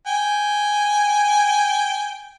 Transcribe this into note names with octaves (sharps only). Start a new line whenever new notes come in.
G5 G#5